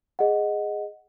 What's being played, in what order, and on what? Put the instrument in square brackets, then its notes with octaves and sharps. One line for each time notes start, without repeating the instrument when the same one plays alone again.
[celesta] G#4 D#5 F#5